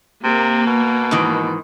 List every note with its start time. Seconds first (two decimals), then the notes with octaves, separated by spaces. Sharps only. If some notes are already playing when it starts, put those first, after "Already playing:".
0.24 C3 A#3
0.67 B2
1.11 G#2 D#3 E3